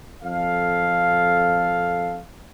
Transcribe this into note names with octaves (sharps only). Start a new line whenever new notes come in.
F2 A4 F5